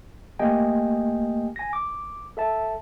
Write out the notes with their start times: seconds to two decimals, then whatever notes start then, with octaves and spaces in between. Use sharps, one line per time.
0.39 A3 A#3 G4 D#5 G5 G#5
1.56 G#5 A#6
1.73 D6
2.37 A4 E5 A5